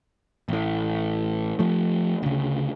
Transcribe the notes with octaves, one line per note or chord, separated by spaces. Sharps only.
A1 A2
F3 A3
D2 C#3